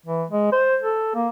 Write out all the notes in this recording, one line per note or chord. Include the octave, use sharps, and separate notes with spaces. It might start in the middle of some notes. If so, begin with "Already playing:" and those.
E3
G#3
C5
A4
A#3